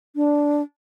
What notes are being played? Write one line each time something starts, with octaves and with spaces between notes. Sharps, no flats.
D4